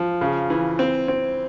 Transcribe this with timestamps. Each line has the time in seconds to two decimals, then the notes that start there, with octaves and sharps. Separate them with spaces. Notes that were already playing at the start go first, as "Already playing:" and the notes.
Already playing: F3
0.21 C#3
0.50 E3
0.79 C4
1.08 C4